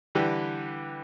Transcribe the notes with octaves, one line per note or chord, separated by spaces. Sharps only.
D3 E3 G3 G4 B4